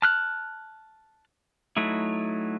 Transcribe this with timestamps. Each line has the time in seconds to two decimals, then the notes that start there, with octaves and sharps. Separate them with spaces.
0.02 A5 F6 F#6
1.77 F#3 A3 D#4 E4